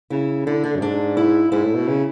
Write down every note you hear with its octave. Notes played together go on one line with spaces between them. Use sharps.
C#3 E4
D3 E4
D3 D4
F#2
G#2 D4
E4
G#2 E4
A2
B2
C#3